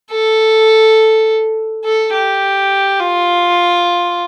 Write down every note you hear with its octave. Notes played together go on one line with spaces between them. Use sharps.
A4
A4
G4
F4